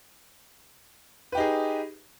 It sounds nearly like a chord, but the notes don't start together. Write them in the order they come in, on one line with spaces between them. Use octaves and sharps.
B4 G4 D#4 G#4